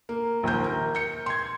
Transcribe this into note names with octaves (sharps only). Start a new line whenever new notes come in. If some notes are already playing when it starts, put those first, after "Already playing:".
A#3
A#1 D#2 A#3 G6
A#4
G6 C#7
C6 G#6